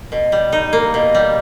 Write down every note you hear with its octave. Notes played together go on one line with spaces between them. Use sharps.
B2
G3
D#4
A#3
B2
G3